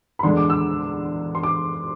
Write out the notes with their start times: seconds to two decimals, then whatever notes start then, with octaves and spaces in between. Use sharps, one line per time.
0.19 B5
0.23 E2 D3 G#3 D4 C6
0.37 D6
0.50 E6
1.35 C6
1.43 D6